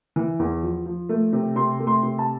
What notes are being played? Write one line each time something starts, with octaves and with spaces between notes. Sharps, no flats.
E3
E2
F3
F3
A3
C3
C3 C6
A3
C6
C3
A5